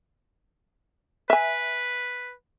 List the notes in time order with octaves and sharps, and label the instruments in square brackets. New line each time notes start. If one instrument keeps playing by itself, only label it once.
[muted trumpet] B4 [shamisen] E5 G#5